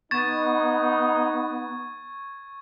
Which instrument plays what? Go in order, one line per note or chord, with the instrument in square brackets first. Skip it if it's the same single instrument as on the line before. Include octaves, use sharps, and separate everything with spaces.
[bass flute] B3 [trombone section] D#4 [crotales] C#6 G#6 [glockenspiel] A6 E7